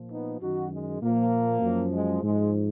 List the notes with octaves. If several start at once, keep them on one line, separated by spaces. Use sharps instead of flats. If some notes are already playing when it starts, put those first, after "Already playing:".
Already playing: A#2 F3
B3 D#4
F#2 D#3 D#4 F#4
G#3
A#2 F3 A#3
F#2 F3
G#3
G#2 F3 G#3